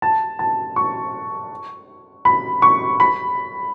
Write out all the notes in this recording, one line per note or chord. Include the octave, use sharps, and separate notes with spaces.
A5
A5
C#6
B5
C#6
B5